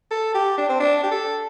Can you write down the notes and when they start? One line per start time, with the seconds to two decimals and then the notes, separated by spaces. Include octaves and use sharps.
0.11 A4
0.34 G4
0.58 D4
0.69 C4
0.80 D4
1.04 G4
1.11 A4